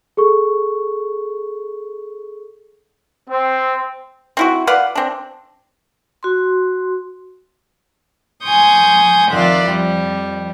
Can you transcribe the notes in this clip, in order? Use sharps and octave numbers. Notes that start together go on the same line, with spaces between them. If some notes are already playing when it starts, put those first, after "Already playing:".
G#4 A4 C#6
C4
C4 E4 F#4
B4 D5 F5 F#5
C4 D4
F#4 C6
G#5 C6 C#6 D#6 G6
F2 D#3 F4 D5 E5 F#6
F2 F3 G3